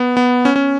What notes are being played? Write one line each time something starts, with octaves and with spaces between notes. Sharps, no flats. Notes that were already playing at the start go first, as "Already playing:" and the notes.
Already playing: B3
B3
C#4
C#4